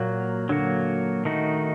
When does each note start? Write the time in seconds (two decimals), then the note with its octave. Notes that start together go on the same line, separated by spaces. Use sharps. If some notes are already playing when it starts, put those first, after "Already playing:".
Already playing: A#2 F#3 A#3 F#4
0.49 D3 F#3 A#3 F#4
1.25 D#3 A3 D#4 F#4